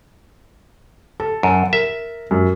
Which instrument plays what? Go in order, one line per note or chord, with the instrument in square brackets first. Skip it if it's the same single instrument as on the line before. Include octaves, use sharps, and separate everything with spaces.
[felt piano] A4
[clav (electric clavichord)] F#2
[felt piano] A#4 [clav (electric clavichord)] E5
[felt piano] F#2